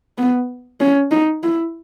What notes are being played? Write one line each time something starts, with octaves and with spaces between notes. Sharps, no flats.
B3
C#4
D#4
E4